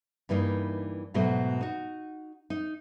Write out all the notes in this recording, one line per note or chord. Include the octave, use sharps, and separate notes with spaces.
G2 E3 A#3 D#4
G#2 B2 F#3 A3
D#4 F#4
D#4